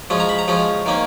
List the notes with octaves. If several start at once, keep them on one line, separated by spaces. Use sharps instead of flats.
F3 G#3 C#4
A#5
B5
A#5
F3 G#3 C#4
D#3 A#3 C#4